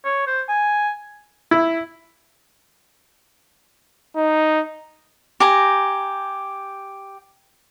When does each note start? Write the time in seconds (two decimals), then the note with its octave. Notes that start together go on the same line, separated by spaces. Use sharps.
0.05 C#5
0.27 C5
0.49 G#5
1.51 E4
4.16 D#4
5.40 G4 G#5 A#5